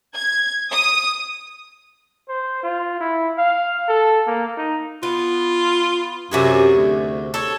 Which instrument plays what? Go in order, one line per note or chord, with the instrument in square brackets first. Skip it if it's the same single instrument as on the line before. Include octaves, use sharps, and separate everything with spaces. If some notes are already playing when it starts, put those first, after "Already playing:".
[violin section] G#6
D#6
[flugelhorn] C5
F4
E4
F5
A4
A#3
D#4
[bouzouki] B3 [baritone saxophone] F4
[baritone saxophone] F#2 [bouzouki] C3 F#4 G#4
[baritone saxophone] D2
[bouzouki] A4 C#5